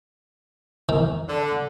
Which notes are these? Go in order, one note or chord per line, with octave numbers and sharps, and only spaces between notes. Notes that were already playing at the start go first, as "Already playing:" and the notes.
D#3
D3